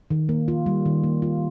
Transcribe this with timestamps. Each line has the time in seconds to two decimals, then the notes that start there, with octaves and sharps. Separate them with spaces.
0.10 D#3
0.29 A#3
0.48 F4
0.66 G3
0.85 D#3
1.03 A#3
1.22 F4